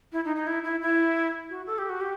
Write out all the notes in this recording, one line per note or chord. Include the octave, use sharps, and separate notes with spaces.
E4
D#4
D#4
E4
E4
E4
F#4
A4
G4
F#4
G4